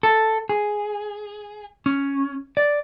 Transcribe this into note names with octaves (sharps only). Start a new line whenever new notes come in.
A4
G#4
C#4
D5